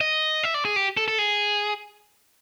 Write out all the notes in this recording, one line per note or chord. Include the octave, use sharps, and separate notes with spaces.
D#5
E5
D5
G#4
G4
A4
A4
G#4